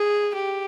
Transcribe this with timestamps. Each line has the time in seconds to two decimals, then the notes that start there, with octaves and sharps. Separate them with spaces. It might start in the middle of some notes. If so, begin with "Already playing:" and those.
Already playing: G#4
0.35 G4